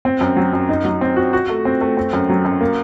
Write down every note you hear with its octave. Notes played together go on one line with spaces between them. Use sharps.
C4
F#2
F#3
F#2
D#4
F#3
C4
F#4
F#4
A3
C4
A3
C4
F#2
F#3
F#2
A#3